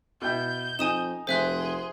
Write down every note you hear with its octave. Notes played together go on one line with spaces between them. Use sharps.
B2 E4 G5 G6
F2 D#4 G#5 D#6 E7
F1 G#4 C5 E5 C6 F#6